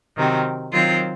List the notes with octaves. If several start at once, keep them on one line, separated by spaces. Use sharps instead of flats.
C3 D#3 F#3 C4
D#3 F#3 C4 F4 C5